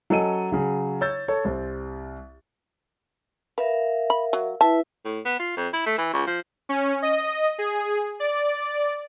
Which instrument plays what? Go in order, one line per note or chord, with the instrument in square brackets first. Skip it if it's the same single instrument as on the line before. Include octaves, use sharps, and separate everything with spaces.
[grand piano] F#3 C#4 A4 D#5 D#7
C#3 F#3
C#5 E6 G6 A6
A4 C#5
C2 C4
[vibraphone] A#4 E5 F5 [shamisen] B4
[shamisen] B5
F#3
[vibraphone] E4 B4 E5 [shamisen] A5
[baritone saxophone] A2
B3
F4
F2
E4
A3
E3
C#2
F3
[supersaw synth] C#4
D#5
G#4
D5